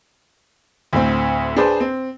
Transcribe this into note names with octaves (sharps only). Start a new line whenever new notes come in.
D2 A2 C4
D4 G#4 B4 C5
C4